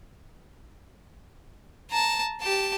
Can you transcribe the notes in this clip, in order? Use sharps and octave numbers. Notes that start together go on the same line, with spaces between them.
A5 A#5
G4 A5